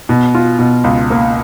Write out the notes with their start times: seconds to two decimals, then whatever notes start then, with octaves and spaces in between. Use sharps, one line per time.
0.09 B2
0.35 F4
0.59 B2
0.84 C#2
1.10 A#3